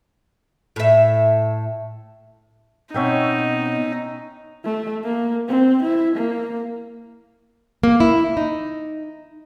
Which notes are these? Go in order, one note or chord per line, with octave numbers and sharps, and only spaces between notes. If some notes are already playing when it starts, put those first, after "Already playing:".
A2 E5
B2 C4 C#4 D#4 E5 G5
A3
A#3
C4
E4
A#3
A#3
E4
D#4